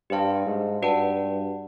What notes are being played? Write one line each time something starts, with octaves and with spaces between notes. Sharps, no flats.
G2 G4 C5 F5 A5
G#2
G2 F#4 B4 D5 F#5 A5